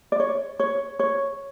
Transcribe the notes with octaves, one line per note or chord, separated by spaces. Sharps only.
D5
C#5
C#5
C#5